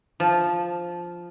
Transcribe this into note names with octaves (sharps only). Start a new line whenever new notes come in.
F3